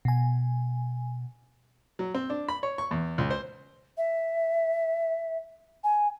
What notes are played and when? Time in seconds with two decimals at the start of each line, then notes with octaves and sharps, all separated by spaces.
0.05 B2 G#5
1.99 F#3
2.14 C4
2.30 D4
2.48 B5
2.63 C#5
2.78 C#6
2.91 E2
3.18 C#2
3.30 C5
3.97 E5
5.84 G#5